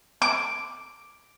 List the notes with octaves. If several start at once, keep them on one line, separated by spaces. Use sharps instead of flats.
D6